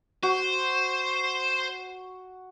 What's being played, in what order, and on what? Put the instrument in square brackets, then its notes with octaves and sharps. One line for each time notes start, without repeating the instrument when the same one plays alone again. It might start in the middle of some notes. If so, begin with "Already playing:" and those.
[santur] F#4 [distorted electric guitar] C5